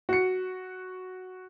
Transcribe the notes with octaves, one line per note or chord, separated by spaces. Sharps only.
F#4 C#7